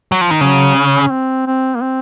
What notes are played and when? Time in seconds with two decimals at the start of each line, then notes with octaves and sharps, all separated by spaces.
0.12 F#3
0.21 F3
0.31 D#3
0.41 C#3 F#3
0.76 C#4
1.02 C#4
1.11 C4
1.47 C4
1.75 A#3
1.81 C4